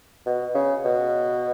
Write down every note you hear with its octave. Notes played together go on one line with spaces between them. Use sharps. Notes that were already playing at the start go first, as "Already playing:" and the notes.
B2
C#3
B2